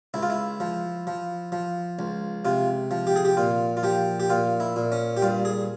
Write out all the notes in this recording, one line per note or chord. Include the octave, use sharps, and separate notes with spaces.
C#2 E4
F4
E4
F3
F3
F3
C#2
C3 F4
F3
G4
G#4
G4
A#2 F4
F4
F3 G4
G4
A#2 F4
E4
A#2
C#4
G4
G2 F4
G#4